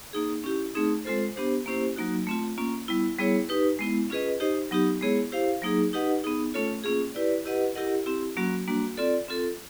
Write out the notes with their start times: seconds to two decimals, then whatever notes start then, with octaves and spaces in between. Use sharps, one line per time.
0.13 A#3 D#4 G#4
0.44 C#4 E4 G4
0.75 A3 C4 D#4 G#4
1.05 G#3 C4 F4 A4 C5
1.36 B3 D4 G4 C5
1.66 A#3 C#4 E4 G4 C5
1.96 F#3 A#3 D#4 F#4
2.27 A3 C4 F4
2.58 A#3 C#4 F4
2.88 G3 B3 E4
3.19 G3 B3 E4 G#4 C#5
3.49 D#4 G4 B4
3.79 G#3 B3 E4
4.10 C#4 F4 G#4 B4 D#5
4.40 D#4 G4 C5 D#5
4.71 F#3 B3 D#4 G4
5.01 G#3 B3 E4 G#4 C#5
5.32 E4 G4 C5 F5
5.62 F#3 A#3 D#4 G#4
5.93 D#4 G4 B4 D#5 F#5
6.24 B3 D#4 G#4
6.54 A3 C#4 F4 A4 C#5
6.84 A#3 C#4 F4 G#4
7.15 E4 G4 B4 D5
7.45 E4 G4 B4 D#5 F#5
7.75 E4 G4 A#4 D#5 F#5
8.06 C4 E4 G4
8.37 F#3 A#3 C#4 F#4
8.68 G3 A#3 D4 F#4
8.98 C4 F4 A4 D5
9.28 C4 F4 A4